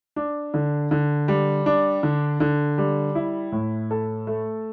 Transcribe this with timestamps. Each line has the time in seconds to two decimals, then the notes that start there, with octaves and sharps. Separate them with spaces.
0.16 D4
0.54 D3
0.91 D3
1.28 G3
1.66 D4
2.03 D3
2.40 D3
2.78 G3
3.15 E4
3.52 A2
3.91 A4
4.27 A3